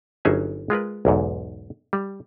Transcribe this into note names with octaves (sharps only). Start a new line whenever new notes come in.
G1 F#3 C#4 D#4 G#4 E5
G#3 F4 A#4 B4
B1 E2 G#2
G3